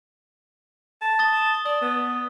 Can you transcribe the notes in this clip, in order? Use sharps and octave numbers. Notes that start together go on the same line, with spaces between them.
A5
D#6 A6 G7
D5 D#6
B3